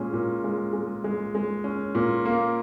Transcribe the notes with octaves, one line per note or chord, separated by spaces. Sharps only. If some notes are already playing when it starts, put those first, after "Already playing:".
Already playing: A#2 G#3 C#4
A#2
G#3
G#3
G#3
G#3
C#4
A#2
A#3